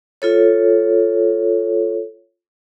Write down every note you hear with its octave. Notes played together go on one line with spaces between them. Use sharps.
F4 A4 C#5